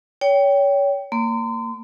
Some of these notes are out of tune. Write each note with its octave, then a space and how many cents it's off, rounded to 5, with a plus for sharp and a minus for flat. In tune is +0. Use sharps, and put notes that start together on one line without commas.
C#5 +25 G5 +0
A#3 -25 C6 -35